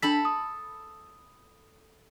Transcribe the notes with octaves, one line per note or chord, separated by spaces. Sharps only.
D4 A4 B5 B6
D#6